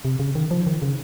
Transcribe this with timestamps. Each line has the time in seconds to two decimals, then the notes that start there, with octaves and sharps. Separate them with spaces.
0.05 C3
0.19 C#3
0.35 D#3
0.51 F3
0.67 D#3
0.82 C#3